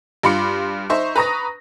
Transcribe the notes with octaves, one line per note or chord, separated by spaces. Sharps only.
G2 F4 B5 C6 D6 C#7
D#4 C5 E5 C#6
B4 A#5 C#6 D#6 A#6